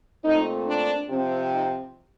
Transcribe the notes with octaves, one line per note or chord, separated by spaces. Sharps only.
A#2 A3 C4 D#4
D4
C3 F3 C4
D#4